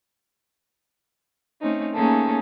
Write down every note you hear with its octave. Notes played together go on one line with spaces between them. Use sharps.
A3 C4 C#4 D#4
A3 A#3 C#4 D#4 G#4 A4